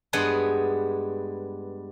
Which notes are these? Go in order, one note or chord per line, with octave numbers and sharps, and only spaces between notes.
G2 G#3 B3 G#4 F#5 C6